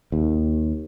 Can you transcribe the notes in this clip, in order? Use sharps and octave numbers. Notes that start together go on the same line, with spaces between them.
D#2